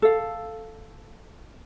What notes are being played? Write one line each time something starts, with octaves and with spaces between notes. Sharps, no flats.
A4 F5